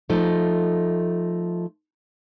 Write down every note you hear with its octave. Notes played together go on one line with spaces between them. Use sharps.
F3 A3 D#4